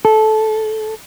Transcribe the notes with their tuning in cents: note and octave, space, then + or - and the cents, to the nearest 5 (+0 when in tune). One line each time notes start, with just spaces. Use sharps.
A4 -15